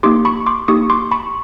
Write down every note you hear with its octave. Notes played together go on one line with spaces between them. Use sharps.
A#3 D#4 G4 C6 D6
B5 C#6
C6 D6
A#3 D#4 G4 C#6 D#6
C6 D6
B5 C#6